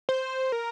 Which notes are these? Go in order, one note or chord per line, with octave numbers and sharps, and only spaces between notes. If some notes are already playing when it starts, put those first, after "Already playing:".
C5
A#4